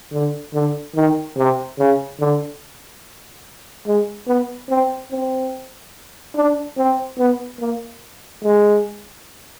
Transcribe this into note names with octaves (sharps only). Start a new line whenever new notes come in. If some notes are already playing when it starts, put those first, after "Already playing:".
D3
D3
D#3
C3
C#3
D3
G#3
B3
C4
C4
D4
C4
B3
A#3
G#3